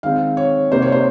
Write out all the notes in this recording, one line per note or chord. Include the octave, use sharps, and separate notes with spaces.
D#3 G#3 C4 F5
C#5
C3 G3 A#3 D#4 C5
C#5
C5